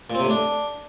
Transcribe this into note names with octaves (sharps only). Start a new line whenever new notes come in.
A#2
C4
C3
A2
D4